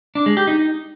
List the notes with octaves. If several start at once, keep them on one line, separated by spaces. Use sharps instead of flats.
D4
G#3
G4
D#4